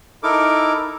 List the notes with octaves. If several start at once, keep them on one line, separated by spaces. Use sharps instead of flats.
D#4 E4 A4 A#4 D6